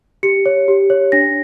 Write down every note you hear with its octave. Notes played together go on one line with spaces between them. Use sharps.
G4 C#7
C#5
G4
C#5
D4 A#6